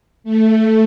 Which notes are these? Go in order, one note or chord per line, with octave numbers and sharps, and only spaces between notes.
A3